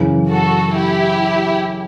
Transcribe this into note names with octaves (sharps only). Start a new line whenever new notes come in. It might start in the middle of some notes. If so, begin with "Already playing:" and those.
Already playing: F#2 C#3 E3
F#4 A4
E4 G4